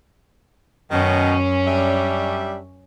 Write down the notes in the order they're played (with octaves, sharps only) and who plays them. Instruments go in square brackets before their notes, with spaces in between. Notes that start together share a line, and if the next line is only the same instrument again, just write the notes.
[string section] F#2 C#4 [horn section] B2 D#3
[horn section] G3 D4 E5